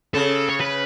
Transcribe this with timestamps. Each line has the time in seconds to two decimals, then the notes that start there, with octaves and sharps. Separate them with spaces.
0.14 C#3 A4
0.49 C#5
0.60 B4